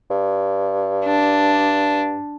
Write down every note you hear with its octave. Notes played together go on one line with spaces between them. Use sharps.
G2
D4